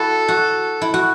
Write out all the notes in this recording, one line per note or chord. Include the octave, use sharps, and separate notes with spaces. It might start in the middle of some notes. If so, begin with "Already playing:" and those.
Already playing: E4 F#4 A4
F#4
E4
F#4